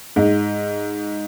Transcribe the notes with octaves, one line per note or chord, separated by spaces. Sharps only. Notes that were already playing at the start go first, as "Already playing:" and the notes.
G#2